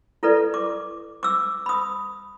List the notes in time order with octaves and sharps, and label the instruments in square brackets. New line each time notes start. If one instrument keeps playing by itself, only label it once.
[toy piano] E4 A4 B4 D5
D6
D6 E6
B5 D#6